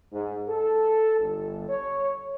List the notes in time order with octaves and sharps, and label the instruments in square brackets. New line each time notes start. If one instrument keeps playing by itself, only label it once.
[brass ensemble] G#2
A4
G1
C#5